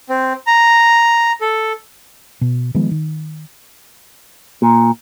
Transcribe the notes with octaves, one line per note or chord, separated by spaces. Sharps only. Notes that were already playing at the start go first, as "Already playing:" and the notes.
C4
A#5
A4
B2
D#3 F3 G#3 B3
D#3
A#2